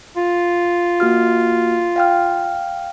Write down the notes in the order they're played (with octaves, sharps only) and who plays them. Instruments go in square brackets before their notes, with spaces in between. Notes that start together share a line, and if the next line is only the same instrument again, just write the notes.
[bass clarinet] F4
[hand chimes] A#3 F#4 F6
F5 G5 F6